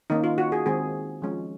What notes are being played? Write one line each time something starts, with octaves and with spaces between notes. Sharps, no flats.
D#3 A#3 C#4 D#4
F4
F#4
G#4
D#3 G#3 C4 G#4
F3 G#3 C#4